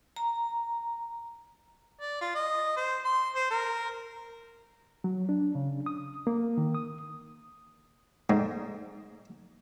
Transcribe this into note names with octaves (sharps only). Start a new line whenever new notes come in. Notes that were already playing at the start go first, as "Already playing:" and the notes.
A#5
D5
F4
D#5
C5
C6
C5
A#4
F#3
D4
C#3
D#6
A#3
D#3
D#6
G#2